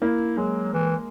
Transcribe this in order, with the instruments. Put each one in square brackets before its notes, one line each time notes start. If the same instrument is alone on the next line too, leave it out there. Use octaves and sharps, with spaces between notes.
[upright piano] A#3 [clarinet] E4
[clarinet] F#3 [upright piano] G#3
[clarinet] E3